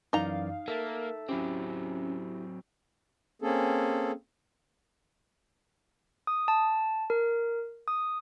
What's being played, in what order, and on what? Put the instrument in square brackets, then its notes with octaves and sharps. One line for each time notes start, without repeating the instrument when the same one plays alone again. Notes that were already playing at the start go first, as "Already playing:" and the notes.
[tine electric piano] F#2 E3 D5 [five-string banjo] D#4 A#5 [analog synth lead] F5
[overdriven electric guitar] A#3 [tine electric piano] A4 E5 A5 [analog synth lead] A#4
[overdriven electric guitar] F#3 C4 [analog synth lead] C#4 [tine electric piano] E4 G4
[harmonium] A#3 C4 C#4 G#4 A4
[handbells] D#6
A5
A#4
D#6